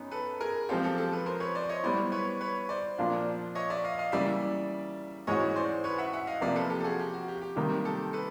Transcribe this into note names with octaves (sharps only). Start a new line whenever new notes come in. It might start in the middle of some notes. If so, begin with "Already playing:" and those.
Already playing: F#2 F#3 B3 D#4
A4 B4
G#4 A#4
F3 G#3 C4 F4 G4 A4
G4 A4
G4 A4
A4 B4
A#4 C5
B4 C#5
C5 D5
C#5 D#5
G3 B3 E4 C5 D5
B4 C#5
B4 C#5
C5 D5
A#2 F3 A#3 D4 F4
C#5 D#5
D5 E5
D#5 F5
D#5 F5
C#3 E3 G3 A#3 D5 E5
G#2 E3 G#3 C#4 F#4 C#5 D#5
C5 D5
B4 C#5
E5 F#5
E5 F#5
D#5 F5
C3 F3 A#3 D5 E5
A4 B4
G4 A4
A4
F#4 G#4
G4
F#4
G4
G4
C3 D#3 G3 A#3 G4
G4 A4
A4 B4